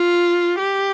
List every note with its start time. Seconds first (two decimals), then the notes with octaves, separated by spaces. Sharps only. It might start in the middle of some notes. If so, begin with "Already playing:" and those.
Already playing: F4
0.59 G4